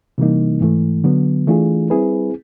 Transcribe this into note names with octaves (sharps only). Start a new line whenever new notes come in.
C3 E3 G3 A#3 D#4
G#2 E3 A3
D3 F#3 B3
E3 A3 D4 F4 G#4
G3 C4 E4 G#4 B4